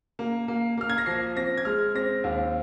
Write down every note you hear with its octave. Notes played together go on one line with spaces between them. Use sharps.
A#3
A#3
A#3 F6
G#6
A#6
F3 C7
C4 A#6
G#6
G#3 F6
C4 A#6
D#2